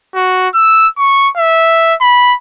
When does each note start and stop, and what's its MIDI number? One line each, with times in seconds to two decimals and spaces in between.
0.16 0.48 66
0.54 0.88 88
0.98 1.29 85
1.37 1.94 76
2.01 2.35 83